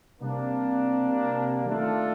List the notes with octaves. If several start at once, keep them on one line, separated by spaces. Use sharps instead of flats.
C3 G3 A#3 D4
D#3 A3 D4 F4 A4